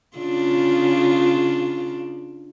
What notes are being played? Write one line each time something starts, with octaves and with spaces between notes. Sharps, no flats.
C#3 D4 F4